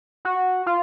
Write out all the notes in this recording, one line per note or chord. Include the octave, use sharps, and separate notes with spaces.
F#4
F4